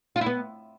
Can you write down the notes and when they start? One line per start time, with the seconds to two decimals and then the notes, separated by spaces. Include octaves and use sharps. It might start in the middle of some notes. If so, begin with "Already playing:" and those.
0.16 F4
0.21 E4
0.26 B3